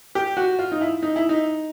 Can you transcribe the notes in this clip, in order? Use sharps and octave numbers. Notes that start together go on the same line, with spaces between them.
G4
F#4
F4
D#4
E4
D#4
E4
D#4